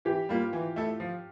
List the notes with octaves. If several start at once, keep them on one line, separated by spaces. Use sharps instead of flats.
E3 G4
G3 A#3 F4
E3
A3 E4 A4
F3